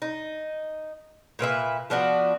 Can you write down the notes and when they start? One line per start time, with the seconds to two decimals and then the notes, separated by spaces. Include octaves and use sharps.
0.02 D#4
1.39 A#2 A#3 B4 E5
1.90 F3 B3 D4 F#4